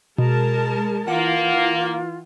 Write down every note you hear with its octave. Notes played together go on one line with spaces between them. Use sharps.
B2 G#3 A#4 A5
E3 A#3 F4 F#5